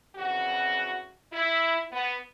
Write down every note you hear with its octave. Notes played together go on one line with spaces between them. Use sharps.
F2 C#3 E3 F#4
E4
B3